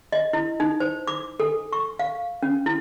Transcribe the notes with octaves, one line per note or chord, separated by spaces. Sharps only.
D#5
E4
D#4
C5
D6
A4
C#6
F5
C#4
E4